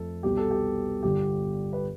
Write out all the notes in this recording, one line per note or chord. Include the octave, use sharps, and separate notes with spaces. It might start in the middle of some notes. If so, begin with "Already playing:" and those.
Already playing: F2 A3 A4
C2 B2 B3 G4
A4
G4
G1 G2 D3 G4
B4